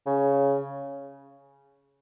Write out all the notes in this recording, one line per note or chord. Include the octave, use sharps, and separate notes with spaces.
C#3